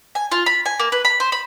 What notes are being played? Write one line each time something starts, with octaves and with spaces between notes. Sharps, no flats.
G#5
F4
B5
G#5
A#3
B4
B5
C5
B5